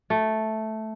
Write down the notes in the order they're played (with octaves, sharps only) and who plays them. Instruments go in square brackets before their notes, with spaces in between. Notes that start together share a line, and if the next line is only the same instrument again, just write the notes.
[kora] A3